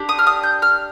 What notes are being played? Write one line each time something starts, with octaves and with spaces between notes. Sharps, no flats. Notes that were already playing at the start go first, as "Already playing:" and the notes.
Already playing: D4 G4
D#6
F6
D#6
G6
F6